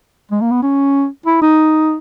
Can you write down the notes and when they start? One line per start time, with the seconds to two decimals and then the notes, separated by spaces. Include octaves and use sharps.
0.31 G#3
0.41 A#3
0.51 B3
0.62 C#4
1.26 E4
1.42 D#4